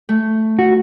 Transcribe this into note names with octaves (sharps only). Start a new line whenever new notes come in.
A3
F#4